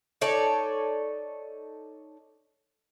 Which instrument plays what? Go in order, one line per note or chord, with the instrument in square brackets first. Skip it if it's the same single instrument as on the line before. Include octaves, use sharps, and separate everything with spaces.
[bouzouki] D#4 A4 C#5 D5